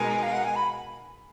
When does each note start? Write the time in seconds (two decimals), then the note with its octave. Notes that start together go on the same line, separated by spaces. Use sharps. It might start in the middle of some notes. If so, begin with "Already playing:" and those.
Already playing: B2 G#3 D#4 A#4 G#5
0.23 F5
0.33 F#5
0.44 G#5
0.56 B5